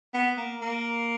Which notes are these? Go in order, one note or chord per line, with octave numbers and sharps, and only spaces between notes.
B3
A#3
A#3